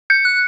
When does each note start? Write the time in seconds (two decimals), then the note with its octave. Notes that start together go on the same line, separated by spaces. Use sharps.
0.10 G6 C#7
0.25 F#6